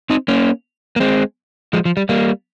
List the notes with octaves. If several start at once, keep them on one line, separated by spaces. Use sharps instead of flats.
C4 D#4
A#3 C#4
A#3
G#3 C4
F3 G#3
F3
G3
G3 A#3